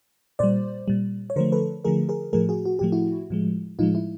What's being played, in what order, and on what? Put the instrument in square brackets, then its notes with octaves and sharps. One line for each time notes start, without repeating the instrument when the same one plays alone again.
[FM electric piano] A#2 G3 C5 D5
A#2 G3
C#5
D3 F3 A3 A#4 C5
A4 B4
D3 F3 A3 G#4 A#4
G#4 A#4
A2 F3 A3 G#4 A#4
F#4 G#4
F#4
A2 F3 A3 G4
E4 F#4
A2 F3 G#3
A2 F3 G#3 D#4 F4
E4